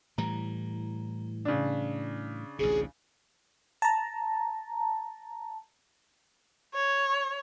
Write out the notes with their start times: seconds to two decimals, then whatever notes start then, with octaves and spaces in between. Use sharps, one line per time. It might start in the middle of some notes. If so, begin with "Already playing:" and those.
0.18 A2 E3 G3 A#5
1.45 C#3 D4
2.59 A1 D2 C3 G#4
3.82 A5 A#5
6.75 C#5